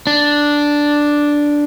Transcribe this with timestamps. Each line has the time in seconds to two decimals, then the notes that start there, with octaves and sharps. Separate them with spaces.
0.07 D4